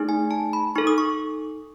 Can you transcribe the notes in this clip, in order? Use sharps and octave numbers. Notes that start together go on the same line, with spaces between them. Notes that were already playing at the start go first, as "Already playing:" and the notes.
Already playing: A3 D#4 G#4
G#5
A5
B5
D#4 A4 C#6
D#6
C#6